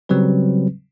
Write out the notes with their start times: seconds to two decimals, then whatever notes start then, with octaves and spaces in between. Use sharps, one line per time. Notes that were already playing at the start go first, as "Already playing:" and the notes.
0.09 C#3 F#3 G3 C4 B4